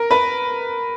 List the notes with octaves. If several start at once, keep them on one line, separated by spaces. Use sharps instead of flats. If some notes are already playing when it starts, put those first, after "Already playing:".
Already playing: A#4
B4